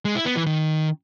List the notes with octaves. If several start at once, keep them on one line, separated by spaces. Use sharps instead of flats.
G#3
E4
B3
E3
D#3